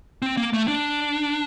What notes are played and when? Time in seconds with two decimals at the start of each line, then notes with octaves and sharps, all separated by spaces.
0.22 C4
0.37 A#3
0.53 A3
0.68 D4